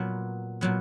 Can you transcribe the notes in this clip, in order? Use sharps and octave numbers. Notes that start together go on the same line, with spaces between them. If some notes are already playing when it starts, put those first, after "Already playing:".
Already playing: A#2 F#3 B3
A#2 F#3 B3